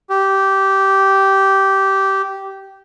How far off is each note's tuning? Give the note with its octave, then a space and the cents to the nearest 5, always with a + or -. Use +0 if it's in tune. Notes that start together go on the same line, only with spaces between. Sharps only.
G4 -15